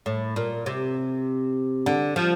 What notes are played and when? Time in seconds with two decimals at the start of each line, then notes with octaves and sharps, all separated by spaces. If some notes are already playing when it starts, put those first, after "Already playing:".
0.06 A2
0.36 A#2
0.66 C3
1.86 D3
2.16 F3